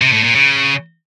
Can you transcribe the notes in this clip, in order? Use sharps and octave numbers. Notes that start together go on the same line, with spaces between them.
C3
A2
A#2
C#3